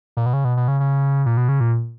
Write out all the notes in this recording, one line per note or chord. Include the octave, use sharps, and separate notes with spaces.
A#2
B2
C#3
B2
B2
C#3
C#3
A#2
B2
C#3
A#2